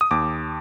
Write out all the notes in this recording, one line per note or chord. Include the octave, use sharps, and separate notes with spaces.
D#6
D#2 D6